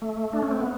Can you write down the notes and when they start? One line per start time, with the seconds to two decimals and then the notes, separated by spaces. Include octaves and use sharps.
0.02 A3
0.33 D4
0.42 C#4
0.51 C4
0.60 B3